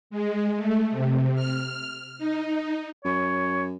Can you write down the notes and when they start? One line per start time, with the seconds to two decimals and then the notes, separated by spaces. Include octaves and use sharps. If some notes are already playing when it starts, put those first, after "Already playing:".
0.10 G#3
0.56 A3
0.91 C3
1.35 F6
2.18 D#4
3.05 F#2 C#5